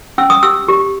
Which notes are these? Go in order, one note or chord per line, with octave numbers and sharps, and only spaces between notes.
C#4 E6
D#6
G4 E6
G4